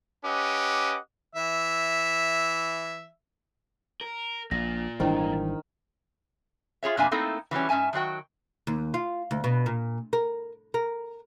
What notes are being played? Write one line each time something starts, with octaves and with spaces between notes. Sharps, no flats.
C#4 G4 B4 D#5 F#5 D6
E3 E5
A#4
A#1 A#2 A#6
G#1 D#3 E3 G3 D4 E4 C5
F4 G#4 C#5 E5
F2 B2 A#3 D4 E5 G#5
A3 A#3 C4 D#4 E4 A4
E3 F#3 G3 C#4
G#2 C#4 E5 G#5 A5
D#3 F#3 F#4 G5
D#2
F4
D2
B2
A#2
A#4
A#4